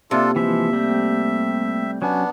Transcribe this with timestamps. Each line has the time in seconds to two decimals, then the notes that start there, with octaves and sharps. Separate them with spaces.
0.11 C3 A#3 D4 F4 A4
0.36 E3 F3 G#3 E5
0.73 G3 A3 C4
2.02 F#3 B3 C#4 D4 G#5